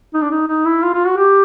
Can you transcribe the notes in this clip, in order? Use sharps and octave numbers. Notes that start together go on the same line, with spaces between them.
D#4
D4
D#4
D#4
E4
F4
F4
F#4
G4